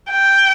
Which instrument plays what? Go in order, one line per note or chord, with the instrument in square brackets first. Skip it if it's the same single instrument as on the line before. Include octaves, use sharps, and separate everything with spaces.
[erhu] G5